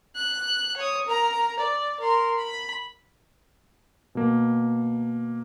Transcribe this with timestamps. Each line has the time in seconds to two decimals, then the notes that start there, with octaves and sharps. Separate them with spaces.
0.16 F#6
0.77 C#5 D#6
1.07 A#4 A#5
1.59 D5
2.00 A#4 C6
2.38 B5
4.15 B2 A#3